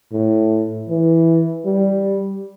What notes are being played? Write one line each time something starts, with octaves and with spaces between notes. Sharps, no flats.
A2
E3
G3